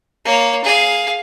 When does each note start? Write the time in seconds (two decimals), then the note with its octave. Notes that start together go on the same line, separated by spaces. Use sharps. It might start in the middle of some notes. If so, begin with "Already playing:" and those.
0.25 A#3 C#5
0.64 G#4 F5